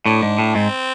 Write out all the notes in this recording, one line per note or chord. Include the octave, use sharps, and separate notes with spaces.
A2 D4
G#2
A2
G#2 C4